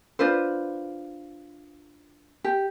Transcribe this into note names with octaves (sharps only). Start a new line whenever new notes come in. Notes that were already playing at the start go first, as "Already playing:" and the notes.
D4 F4 B4 C5
G4